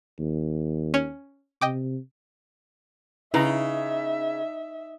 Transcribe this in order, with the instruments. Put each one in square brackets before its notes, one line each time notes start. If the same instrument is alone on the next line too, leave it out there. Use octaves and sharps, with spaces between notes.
[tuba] D#2
[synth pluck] C#4 C#5
[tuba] C3 [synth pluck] D#5 G5 D6
[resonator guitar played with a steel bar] C#3 [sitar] D#4 [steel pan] E4 B4 A#5 [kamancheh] E5